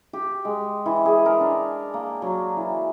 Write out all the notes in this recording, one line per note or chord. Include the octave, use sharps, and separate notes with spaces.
G4
G#3
E3
G#4
A#4
D4
A#3
F#3
E3